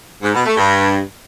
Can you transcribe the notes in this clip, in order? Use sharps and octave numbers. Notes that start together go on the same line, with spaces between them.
G#2
B2
A3
G2